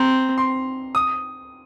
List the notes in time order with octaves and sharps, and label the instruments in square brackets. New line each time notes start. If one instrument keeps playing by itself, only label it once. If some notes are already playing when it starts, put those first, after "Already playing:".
Already playing: [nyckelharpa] C4 [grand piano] A#5
[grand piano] C6
D#6